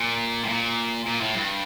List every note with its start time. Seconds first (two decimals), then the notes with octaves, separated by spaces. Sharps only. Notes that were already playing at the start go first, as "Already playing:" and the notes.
Already playing: A#2
0.44 A2
0.48 A#2
1.06 A#2
1.21 A2
1.35 G2